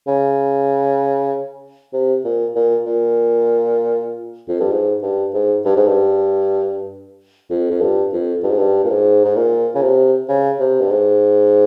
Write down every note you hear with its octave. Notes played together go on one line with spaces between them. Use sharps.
C#3
C3
A#2
A#2
A#2
F2
G2
G#2
G2
G#2
G2
G#2
G2
F2
F2
G2
F2
G2
G#2
G2
A#2
G#2
G#2
A#2
C#3
C3
C#3
C3
G2
G#2